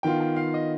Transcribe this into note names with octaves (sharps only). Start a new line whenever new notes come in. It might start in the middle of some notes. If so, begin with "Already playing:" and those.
D#3 B3 F4 G5
G5
F5
D#5